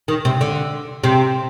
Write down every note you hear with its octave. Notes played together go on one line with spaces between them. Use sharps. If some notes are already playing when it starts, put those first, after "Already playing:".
D#3
C3
D3
C3